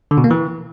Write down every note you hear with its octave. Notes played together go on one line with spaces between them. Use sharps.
D3
B2
A#3
E3